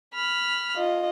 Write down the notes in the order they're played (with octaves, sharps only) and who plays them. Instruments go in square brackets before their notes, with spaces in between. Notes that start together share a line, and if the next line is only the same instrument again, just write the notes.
[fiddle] B5 F6
[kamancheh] F4 D#5